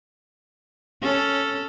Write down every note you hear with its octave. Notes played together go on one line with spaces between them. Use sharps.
C#4 A4